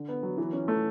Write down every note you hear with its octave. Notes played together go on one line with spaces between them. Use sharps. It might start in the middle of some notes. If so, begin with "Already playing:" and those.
Already playing: D3
B3
F#3
E3
C#4
A3